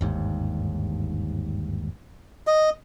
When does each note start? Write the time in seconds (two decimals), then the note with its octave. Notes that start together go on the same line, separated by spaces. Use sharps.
0.01 G1 D#2 G#2
2.47 D#5